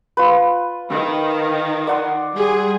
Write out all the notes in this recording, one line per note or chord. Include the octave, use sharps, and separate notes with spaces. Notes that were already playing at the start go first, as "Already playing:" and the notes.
F4 B4
D#3
D5 F#5 C6
G3 G#4